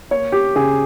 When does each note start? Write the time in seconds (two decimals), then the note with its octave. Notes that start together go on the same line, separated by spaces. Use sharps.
0.11 A#3 C#5
0.32 G4
0.55 C#3 G#4